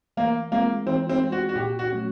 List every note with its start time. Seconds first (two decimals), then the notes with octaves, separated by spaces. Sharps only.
0.17 E3 A#3
0.52 G#3 A#3 C4 F4
0.86 E3 C4
1.09 C4
1.21 G#3 C4 F4
1.32 F#4
1.49 F#4
1.56 A#2 G4
1.79 F#4
1.91 F#3 A3 C#4 F#4